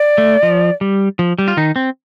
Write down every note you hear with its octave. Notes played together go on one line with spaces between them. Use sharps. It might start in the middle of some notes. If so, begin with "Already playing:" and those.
Already playing: D5
A3
F3
G3
F3
G3
F4
D#3 D#4
C4